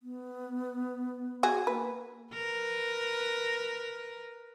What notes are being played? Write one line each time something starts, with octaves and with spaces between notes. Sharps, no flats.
B3
F#4 G#4
A#3 B4
A#4 B4